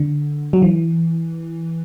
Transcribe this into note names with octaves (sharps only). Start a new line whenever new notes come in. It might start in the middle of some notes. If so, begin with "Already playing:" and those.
Already playing: D3
F#3
E3